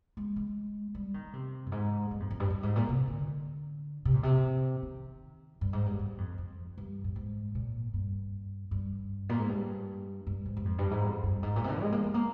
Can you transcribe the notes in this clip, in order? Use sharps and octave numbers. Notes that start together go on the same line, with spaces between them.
G#3
G#3
G3
D#3
C3
G2
G#2
G2
F2
F2
G2
G2
G#2
A#2
C3
D3
C3
A#2
C3
D#3
G2
G#2
G2
G2
F2
F2
G2
G2
G#2
A#2
G2
G2
A#2
G#2
G2
G2
G#2
G2
F2
G2
G#2
F2
G2
G#2
A#2
C3
D3
G#3
A#3
G#3
A#3